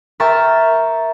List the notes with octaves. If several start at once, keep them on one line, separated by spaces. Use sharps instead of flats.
A#4 E5 G5 A#5 C#6 A6